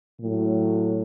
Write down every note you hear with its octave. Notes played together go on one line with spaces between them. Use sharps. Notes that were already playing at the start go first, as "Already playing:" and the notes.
A2 F#3